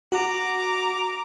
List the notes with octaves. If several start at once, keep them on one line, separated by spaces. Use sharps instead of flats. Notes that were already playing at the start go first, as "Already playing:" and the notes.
F#4 A#5 D6